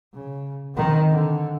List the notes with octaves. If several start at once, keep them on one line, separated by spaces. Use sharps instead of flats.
C#3
D#3 C4
D3